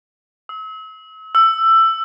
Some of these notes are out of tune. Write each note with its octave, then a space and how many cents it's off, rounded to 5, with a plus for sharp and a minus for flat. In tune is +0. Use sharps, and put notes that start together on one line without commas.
E6 -40
E6 +15